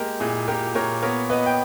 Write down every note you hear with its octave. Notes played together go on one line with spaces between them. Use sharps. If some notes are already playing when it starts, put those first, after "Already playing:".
Already playing: G#3 A#3 G4 A#4
A#2 E4 G#4
A#2 G4 A#4
A#2 A#4 C#5
B3 A#4 C#5
B3 B4 D#5
G5